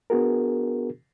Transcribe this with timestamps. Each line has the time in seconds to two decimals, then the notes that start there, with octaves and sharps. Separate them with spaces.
0.10 B3 D4 F#4 G#4 A#4